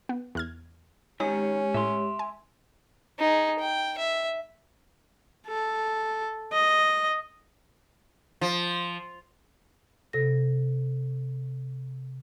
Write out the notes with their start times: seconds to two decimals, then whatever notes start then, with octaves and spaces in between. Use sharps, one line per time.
0.09 B3
0.35 E2 F6 G#6
1.20 G#2 D#3 G#3 C#4 D#4 G4 C#5
1.74 A2 E5 C6
2.19 G#5
3.19 D#4 G#4
3.59 G5
3.98 E5
5.47 A4
6.53 D#5
8.41 F3
10.13 C3 A4 A#6